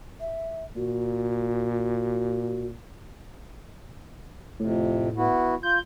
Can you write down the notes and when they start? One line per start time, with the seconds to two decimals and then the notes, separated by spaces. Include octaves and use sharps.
0.20 E5
0.76 A#2 F#4
4.60 F2 A2 C3
5.17 B3 E4 F#4
5.63 F4 G6